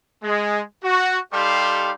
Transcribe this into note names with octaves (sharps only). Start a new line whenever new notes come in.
G#3
F#4
G3 D#4 G4 A4 F5 C6